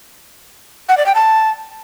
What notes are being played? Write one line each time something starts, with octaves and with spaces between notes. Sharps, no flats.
F#5
D5
G5
A5